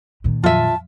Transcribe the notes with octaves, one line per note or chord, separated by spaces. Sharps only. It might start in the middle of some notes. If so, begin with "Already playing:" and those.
A#2 D#3
F2 F3 F#3 F4 E5 A5